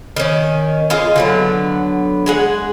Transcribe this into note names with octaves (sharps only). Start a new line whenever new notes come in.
D#3 C#4
F4 G#4 D#5
D3 F#3 B3
G#3 G#4 F#5